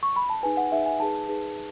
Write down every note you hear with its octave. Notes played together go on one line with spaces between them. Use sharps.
C#6
B5
A5
D#4 G#4 B4 G#5
F#5
D#4 G#4 B4 E5
G#5
D#4 G#4 B4 A5
D#4 G#4 B4